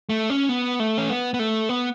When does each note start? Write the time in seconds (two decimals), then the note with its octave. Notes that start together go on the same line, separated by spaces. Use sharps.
0.09 A3
0.30 C#4
0.49 B3
0.80 A3
0.98 C#4
1.10 B3
1.34 B3
1.39 A3
1.69 B3